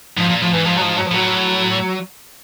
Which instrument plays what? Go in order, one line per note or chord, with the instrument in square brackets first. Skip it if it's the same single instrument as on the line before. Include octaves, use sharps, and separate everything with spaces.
[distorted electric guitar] G#2 [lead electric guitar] F3
[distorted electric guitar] A#2
[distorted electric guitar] A2 [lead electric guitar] F3
[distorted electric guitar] G#2 [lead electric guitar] E3
[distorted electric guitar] G#2 [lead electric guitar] F3
[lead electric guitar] F#3
F3
F#3
F3
[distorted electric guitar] A2 [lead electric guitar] F#3